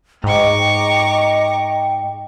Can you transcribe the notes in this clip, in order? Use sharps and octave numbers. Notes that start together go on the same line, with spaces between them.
G#2 D#5 G5 A#5 C#6 D6